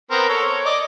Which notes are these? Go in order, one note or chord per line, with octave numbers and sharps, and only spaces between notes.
B3 C4 A#4
A4 C#5
C#5
D5 D#5